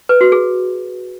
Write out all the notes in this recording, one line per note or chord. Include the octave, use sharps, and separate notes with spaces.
B4
F#4
G#4